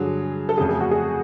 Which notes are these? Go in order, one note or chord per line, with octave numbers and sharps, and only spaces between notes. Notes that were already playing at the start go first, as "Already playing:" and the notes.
Already playing: G2 D3 F#3 G#4
A4
F2 C#3 F#3 A3 G#4
G#4
F#4
G#4